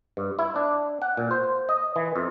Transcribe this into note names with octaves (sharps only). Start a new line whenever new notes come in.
G2
E4
D4
F#5
A#2
C5
D#5
E3
F2